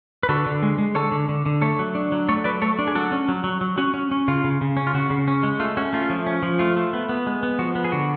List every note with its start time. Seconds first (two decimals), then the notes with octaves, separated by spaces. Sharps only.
0.23 B4
0.29 D3 F#4 A4
0.46 D3
0.63 G#3
0.78 G#3
0.95 D3 A4 C#5
1.12 D3
1.29 D3
1.46 D3
1.62 A3 A4 C#5
1.79 F#3
1.95 D4
2.12 F#3
2.29 A3 A4 C#5
2.44 F#3 B4 D5
2.62 A3 A4 C#5
2.79 D4
2.88 G#4
2.95 F#3 F#4 A4
3.12 C#4
3.28 F#3
3.44 F#3
3.61 F#3
3.78 C#4 F#4
3.94 C#4
4.11 C#4
4.28 C#3 F4
4.44 C#3
4.61 C#3
4.77 C#4
4.87 F4
4.94 C#3 F#4
5.10 C#3
5.28 C#4
5.43 G#3
5.60 A3 F4
5.77 C#4 F#4
5.93 A3 F4
6.10 F3
6.26 C#4
6.43 F3
6.59 A3 F4
6.76 A3
6.93 B3
7.09 B3
7.27 G#3
7.43 B3
7.59 F3 F#4
7.75 B3
7.84 G#4
7.92 D3 F#4